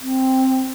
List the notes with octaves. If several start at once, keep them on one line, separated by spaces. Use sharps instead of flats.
C4